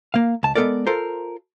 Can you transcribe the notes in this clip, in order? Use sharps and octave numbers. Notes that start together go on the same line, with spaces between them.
A#3 F5
C#2 A5
G#3 B3 C4 A4 A#4 D5
F4 A4 A#4 C5